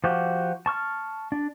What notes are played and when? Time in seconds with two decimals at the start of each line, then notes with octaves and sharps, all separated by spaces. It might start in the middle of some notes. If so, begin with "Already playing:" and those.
0.04 F3 F#4 G4
0.66 A5 C#6 F6
1.32 D4